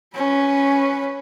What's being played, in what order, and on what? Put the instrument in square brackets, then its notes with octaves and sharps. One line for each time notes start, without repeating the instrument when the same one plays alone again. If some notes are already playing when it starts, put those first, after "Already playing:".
[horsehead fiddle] C#4 B4